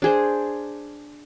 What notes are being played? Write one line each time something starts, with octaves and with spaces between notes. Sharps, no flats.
D4 G#4 C5